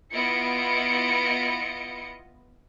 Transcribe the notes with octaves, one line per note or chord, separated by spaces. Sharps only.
B3 E4 F4 D#5 C#7 D7